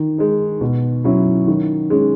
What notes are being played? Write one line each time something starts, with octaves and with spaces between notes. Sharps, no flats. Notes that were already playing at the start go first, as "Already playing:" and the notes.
Already playing: D#3
G#3 D#4
B2
F#3 C#4 E4
D#3
G#3 C#4